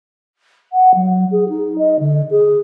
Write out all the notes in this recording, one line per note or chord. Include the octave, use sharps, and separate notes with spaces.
F#5
F#3
G#4
D#4
D#5
D3
G#4